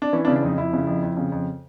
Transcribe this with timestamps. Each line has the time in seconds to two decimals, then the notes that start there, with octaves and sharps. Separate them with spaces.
0.02 D4
0.13 E3 C#4
0.25 D4
0.27 C#3
0.36 D4
0.42 F2 D#4
0.58 F2 E4
0.73 C#3
0.87 F2
1.02 F2
1.17 C#3
1.32 F2